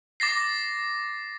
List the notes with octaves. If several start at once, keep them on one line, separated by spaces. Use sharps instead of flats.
D6 A6 A#6 C7